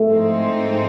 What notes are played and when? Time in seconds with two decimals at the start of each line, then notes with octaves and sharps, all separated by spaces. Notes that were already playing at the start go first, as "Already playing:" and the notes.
Already playing: A3
0.10 G#2 F3 G#3 C4 D#4